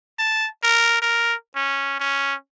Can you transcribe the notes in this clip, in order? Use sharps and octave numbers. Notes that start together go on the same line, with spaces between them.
A5
A#4
A#4
C#4
C#4